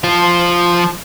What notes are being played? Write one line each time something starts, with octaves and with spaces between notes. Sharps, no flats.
F3 F4